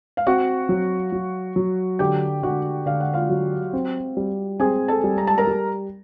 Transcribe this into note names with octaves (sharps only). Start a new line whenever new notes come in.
F5
C4 F#4 F#5
F#3
F#3
F#3
D3 G4 G5
D3 F#4 F#5
D3 F5
F#5
F4 F5
F#3
C4
G3
C4 G#4 G#5
A4 A5
G3
A#5
A5
A#4 A#5
G3